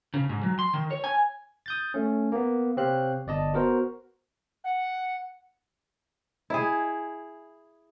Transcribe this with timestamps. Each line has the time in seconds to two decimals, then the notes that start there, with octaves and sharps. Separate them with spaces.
0.14 C#3
0.29 G#2
0.43 F#3
0.59 C6
0.74 D#3
0.91 C#5
1.04 G#5
1.66 D#6 G6 A6
1.94 A3 C#4
2.32 A#3 B3
2.77 C3 C4 G4 C#5 F5 F#6
3.27 G1 D5 D#5 A5
3.53 B3 F#4 A#4 C5
4.64 F#5
6.50 E4 G#4